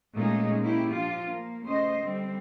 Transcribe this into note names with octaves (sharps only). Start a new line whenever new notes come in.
A#2 G#3 A3 C#4 D#4 G#4
A#3 C#4 E4 G4
F3 D4 F4
A#3
C#3 A3 C#4 C5 D#5
D3 G3 C4